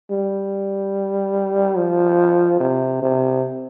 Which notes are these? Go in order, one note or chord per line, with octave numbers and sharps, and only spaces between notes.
G3
F3
C3
C3